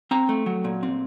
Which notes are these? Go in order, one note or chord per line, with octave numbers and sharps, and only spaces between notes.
C4 A#5
A3
F#3
A#2
C4